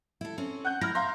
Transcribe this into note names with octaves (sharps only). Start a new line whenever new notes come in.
E4 A4
C4 C#4 A4
F#5 F#6 G6
E4 A#5 F6 A#6
E5 F5 A#5 C6